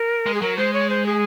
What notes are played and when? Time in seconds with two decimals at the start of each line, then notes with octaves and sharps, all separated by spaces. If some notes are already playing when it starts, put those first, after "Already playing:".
Already playing: A#4
0.26 G#3
0.34 G#4
0.41 F#3 A#4
0.57 G#3 C5
0.73 C#5
0.89 C5
1.06 G#4